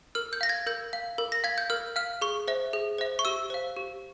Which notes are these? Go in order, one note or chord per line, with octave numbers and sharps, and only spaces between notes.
A#4 F6
G6
F5 A#6
G#6
A#4 G6
F5
A#4
A#6
F5 G#6
G6
A#4 F6
F5 F6
G#4 C#6
C5 E5
G#4
C5 E5
C#6
G4 E6
C5 F5
G4